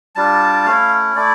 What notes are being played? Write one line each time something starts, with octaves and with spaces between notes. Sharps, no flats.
G3 D4 F4 A5
A3 C#4 E4 F5
A3 E4 D5